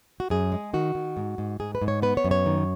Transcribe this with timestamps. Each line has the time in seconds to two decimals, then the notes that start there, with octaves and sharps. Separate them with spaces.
0.20 F#4
0.30 F#2 G#4
0.52 G#3
0.74 D#3 F#4
0.95 D#3
1.17 G#2
1.38 G#2
1.60 G#2 G#4
1.75 B4
1.82 G#2
1.88 C#5
2.02 B3 B4
2.17 C#5
2.24 F#2
2.31 C#5
2.46 D#3